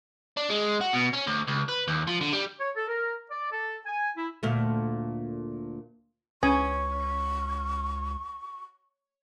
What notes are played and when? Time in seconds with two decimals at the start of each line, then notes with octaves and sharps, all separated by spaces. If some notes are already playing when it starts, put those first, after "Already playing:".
0.37 D4
0.49 G#3
0.81 F#4
0.93 B2
1.13 C#4
1.27 D2
1.48 C#2
1.69 B4
1.87 D#2
2.07 F3
2.21 D3
2.33 G3
2.59 C#5
2.76 A4
2.88 A#4
3.31 D5
3.51 A4
3.86 G#5
4.17 E4
4.43 D2 A#2 A3
6.43 C#2 C#4 B4 G#5 C#6 D#6